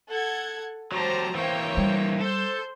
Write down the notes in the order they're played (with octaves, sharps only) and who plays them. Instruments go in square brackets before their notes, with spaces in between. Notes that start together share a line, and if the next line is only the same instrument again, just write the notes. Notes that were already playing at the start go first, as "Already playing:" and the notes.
[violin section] A4 F#5 G#6
[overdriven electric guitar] F#3 G4 [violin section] C5 A5 A#5
[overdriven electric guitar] E3 A#3 [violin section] C5 C#5 G5
[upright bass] G3
[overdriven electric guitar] A4 [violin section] C5 G6